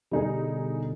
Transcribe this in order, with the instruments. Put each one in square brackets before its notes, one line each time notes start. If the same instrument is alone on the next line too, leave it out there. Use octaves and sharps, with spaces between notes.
[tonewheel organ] B2 D3 [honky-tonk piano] G3 D#4 G#4